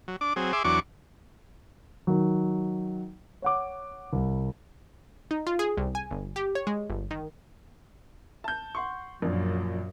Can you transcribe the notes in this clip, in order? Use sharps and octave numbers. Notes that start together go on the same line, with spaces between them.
F#3
D4 D6
F#3 C4 G#4
G#4 E5 C6 D6
E2 F#3 D4 C#6 D6
D#3 F#3
C#5 F#5 D6
C2
D#4
F4
G#4
C2
G#5
G1
G4
C#5
G#3
G1
D#3
A5 G6
F#5 C6 C#6
A#1 F#2 A#2